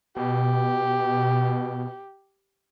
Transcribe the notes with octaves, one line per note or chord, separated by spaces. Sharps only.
B2 G4